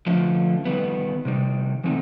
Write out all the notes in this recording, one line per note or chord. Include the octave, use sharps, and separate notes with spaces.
D3 F3 A3 C#4
D#3 G3 B3
C3 D#3 G3
E3 A3 C4 D#4